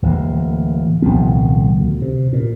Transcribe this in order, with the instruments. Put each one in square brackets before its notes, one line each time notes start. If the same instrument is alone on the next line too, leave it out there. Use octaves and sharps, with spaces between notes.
[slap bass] D1 D2 E3 A#3
D#1 C2 F3 B3
D2
C3
A#2